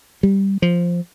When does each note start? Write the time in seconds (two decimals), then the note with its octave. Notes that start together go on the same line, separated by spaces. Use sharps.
0.23 G3
0.62 F3